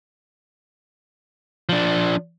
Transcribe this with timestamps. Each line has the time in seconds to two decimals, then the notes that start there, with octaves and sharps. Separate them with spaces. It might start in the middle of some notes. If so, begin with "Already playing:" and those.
1.69 F3 D4